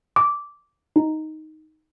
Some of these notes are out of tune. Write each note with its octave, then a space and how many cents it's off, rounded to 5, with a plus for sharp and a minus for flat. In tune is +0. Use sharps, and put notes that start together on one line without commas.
D6 -10
D#4 +5